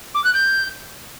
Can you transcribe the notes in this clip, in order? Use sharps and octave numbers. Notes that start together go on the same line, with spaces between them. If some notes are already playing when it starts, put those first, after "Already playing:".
D6
F#6
G6